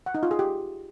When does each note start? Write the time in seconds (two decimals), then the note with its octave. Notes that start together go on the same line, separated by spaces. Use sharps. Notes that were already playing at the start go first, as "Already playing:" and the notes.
0.06 F#5
0.15 D#4
0.23 F4
0.31 G#4
0.39 G4